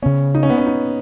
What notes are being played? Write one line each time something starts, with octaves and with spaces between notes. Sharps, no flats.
C#3 B3 C#4
D#4
C#4
B3
C#4
D#4